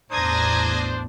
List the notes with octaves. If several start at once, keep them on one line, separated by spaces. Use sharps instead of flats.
A1 E2 D4 C5 A#5 D#6 G#6 A#6